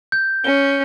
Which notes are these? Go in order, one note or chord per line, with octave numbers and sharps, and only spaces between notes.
G6
C#4 G7